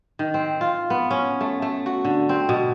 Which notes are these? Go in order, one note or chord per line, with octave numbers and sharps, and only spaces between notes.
D#3
C4
F4
B3
C#4
A3
A3
F#4
D3
C4
B2